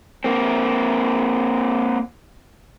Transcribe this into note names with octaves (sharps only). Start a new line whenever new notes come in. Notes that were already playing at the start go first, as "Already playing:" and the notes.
A#3 C4